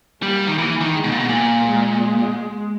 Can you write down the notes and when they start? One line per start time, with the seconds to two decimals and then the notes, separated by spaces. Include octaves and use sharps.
0.22 G3 A#3
0.47 D#3
0.58 E3 A#3
0.81 D#3
0.92 G#3
1.04 B2
1.12 A#2
1.20 B2
1.28 A#2 A#3
1.63 G#3